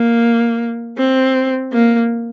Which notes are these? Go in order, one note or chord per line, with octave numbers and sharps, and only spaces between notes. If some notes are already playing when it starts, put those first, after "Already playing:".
Already playing: A#3
C4
A#3